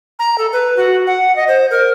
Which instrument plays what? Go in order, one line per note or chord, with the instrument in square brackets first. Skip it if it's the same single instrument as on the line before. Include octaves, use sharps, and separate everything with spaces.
[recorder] A#5
A4
B4
F#4
F#5
D#5
C5
A#4